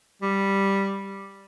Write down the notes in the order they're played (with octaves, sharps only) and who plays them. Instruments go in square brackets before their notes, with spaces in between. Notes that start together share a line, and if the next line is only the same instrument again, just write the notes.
[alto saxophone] G3